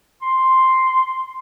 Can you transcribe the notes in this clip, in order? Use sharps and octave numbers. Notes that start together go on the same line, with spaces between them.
C6